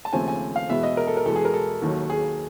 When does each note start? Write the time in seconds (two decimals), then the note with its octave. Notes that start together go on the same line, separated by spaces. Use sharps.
0.05 A5
0.13 D#2 C#3 F3 A3 C4 G#5
0.28 G#5
0.56 F5
0.69 E2 B2 G#3 B3 E5
0.83 D#5
0.97 A#4
1.07 A4
1.17 A#4
1.26 E2 B2 G#3 A4
1.36 G#4
1.45 A#4
1.54 A4
1.82 D#2 D#3 F#3 A#3
2.10 G#4